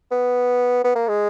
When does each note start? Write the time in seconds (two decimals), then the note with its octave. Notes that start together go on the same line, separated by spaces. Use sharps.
0.11 B3
0.84 B3
0.95 A#3
1.08 G#3